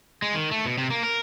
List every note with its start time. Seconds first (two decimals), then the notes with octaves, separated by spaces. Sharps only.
0.22 G#3
0.34 D#3
0.51 A3
0.65 B2
0.78 C3
0.90 A#3
1.03 A#4